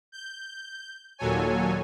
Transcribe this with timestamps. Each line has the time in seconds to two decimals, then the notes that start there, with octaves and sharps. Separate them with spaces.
0.12 G6
1.18 D#2 A#2 F#3 A4 C#5 G#5